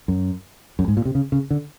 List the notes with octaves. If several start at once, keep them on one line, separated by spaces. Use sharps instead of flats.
F#2
F#2
G#2
A#2
C3
C#3
C#3
D3